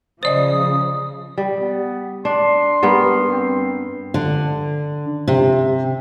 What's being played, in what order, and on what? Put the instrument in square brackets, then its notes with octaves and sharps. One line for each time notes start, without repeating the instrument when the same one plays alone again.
[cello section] C#3 F3 [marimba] C5 D5 D#5 [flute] D#6
[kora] G3
[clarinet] B3
[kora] D4 [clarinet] C6
[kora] G2 B3 A#4
[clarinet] C4
[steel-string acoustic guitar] D3
C3